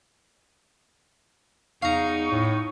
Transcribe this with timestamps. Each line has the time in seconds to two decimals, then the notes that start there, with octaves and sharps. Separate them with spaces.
1.82 E2 D#4 F5 A#5 C#6
2.31 A2